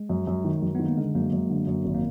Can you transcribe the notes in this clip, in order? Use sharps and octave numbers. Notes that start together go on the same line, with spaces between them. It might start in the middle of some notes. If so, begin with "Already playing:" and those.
Already playing: G#3
F#2
F#2
D#3
F#2
D#3 B3
A#3
D3 G#3
F#2 A#3
F#2
D3
F#2
G#1
A#3